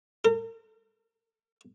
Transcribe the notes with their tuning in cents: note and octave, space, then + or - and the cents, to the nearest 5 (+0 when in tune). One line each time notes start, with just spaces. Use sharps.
A#4 -40